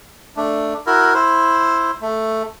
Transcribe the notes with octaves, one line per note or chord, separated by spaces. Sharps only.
A3 D4
E4 F#4 A#4
E4 C5
A3